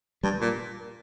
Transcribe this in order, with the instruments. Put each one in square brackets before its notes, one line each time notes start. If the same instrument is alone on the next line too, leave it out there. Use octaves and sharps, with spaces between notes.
[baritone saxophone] G2 [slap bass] G3
[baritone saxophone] A#2